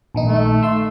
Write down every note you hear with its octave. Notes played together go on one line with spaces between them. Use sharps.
A#1 D#3 D#4
A3
E5 C6 E6